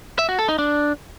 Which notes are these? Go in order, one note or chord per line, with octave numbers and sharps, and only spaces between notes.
E5
F#4
A4
D#4
D4